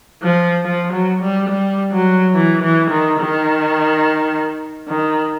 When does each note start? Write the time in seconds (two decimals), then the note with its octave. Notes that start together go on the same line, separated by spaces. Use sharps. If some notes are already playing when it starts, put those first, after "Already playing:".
0.22 F3
0.65 F3
0.92 F#3
1.22 G3
1.49 G3
1.92 F#3
2.35 E3
2.62 E3
2.90 D#3
3.19 D#3
4.88 D#3